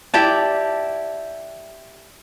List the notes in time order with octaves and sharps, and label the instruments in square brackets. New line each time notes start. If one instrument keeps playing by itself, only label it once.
[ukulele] E4 G4 D5 A5